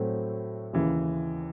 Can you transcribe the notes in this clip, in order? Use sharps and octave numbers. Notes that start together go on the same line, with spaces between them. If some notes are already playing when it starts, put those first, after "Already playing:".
Already playing: A2 F#3 A3 C4
D#2 C#3 E3